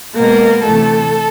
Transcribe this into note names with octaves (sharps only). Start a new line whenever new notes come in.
B2 G#3 A#3 B3 A#4
D2 C3 E3 A3 A4